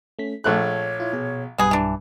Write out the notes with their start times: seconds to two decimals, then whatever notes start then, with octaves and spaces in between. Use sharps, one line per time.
0.19 A3 C#4 B6
0.44 A#1 A3 G#4 C#5 F#6
1.00 E4 F4
1.13 B2 G#4
1.58 B1 G2 G3 B3 G#4
1.71 E3 D4